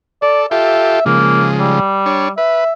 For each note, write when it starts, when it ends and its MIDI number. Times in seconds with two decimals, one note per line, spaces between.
0.22 0.46 69
0.22 0.44 74
0.51 1.00 65
0.51 1.00 67
0.51 1.00 69
0.51 1.04 76
1.06 1.80 49
1.06 1.80 53
1.06 1.80 56
1.06 1.47 58
1.59 2.30 55
2.06 2.29 62
2.06 2.29 73
2.38 2.64 71
2.38 2.73 76